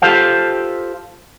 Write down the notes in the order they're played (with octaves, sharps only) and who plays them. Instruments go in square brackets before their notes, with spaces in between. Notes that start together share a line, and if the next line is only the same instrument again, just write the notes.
[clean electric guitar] F4 G4 A4 C5 F5